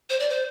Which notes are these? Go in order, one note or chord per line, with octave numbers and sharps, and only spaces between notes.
C5
D5
C5